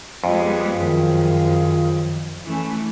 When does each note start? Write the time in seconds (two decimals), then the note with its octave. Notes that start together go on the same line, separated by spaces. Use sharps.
0.24 F2 G3 G#3 B3 F4 G#4
0.79 F#2 D#3 F3
2.46 E3 A3 C#4